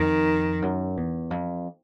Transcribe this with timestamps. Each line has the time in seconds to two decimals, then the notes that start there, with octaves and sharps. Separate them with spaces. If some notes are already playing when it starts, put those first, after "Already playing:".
Already playing: F2 D#3
0.62 F#2
0.97 E2
1.31 F2